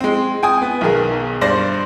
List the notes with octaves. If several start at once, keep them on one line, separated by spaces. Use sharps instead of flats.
G#3 C4
G5 G#5 D#6
B3
B1 B2 D#3 G#4 A#4
G2 C5 D5 C6 A#6